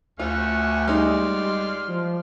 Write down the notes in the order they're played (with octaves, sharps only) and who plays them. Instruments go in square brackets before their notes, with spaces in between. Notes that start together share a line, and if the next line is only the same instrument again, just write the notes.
[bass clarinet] D2 [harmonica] A3 C#4 F#5 [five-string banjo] F4
[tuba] G3 [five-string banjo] G#3 D#4 [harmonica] D5 C6 F6
[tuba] F3